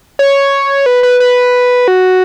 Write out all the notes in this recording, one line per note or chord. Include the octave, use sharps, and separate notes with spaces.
C#5
B4
B4
B4
F#4